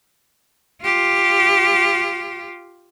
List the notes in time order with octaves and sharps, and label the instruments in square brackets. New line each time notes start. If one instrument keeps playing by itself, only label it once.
[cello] F4 G4